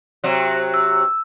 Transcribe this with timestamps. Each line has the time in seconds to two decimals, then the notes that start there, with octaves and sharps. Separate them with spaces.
0.24 C3 F#3
0.74 E6